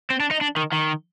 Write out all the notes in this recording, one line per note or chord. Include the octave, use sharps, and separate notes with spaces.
C4
D4
D#4
D4
D#3
D#3